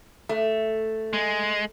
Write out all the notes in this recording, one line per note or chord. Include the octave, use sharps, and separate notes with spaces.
A3
G#3